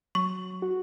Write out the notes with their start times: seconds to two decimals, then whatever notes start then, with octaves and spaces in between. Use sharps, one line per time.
0.15 F#3 C#6
0.62 F#4